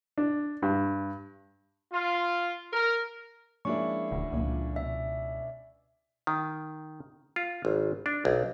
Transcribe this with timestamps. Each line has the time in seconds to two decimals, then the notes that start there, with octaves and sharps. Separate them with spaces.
0.18 D4
0.62 G2
1.93 F4
2.72 A#4
3.65 F3 G#3 A#3 C#4 D4 E4 C#6
4.11 D#1 D2
4.33 C#2 A#2 D3 F3
4.76 B2 E5
6.27 D#3
7.36 F4
7.65 G#1
8.06 D4
8.25 B1